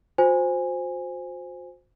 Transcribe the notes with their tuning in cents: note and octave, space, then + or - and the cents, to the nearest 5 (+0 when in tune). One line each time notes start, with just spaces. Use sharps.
F#4 -45 C5 -5 G#5 -15